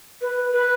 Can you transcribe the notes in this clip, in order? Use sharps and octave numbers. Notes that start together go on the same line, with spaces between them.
B4
B4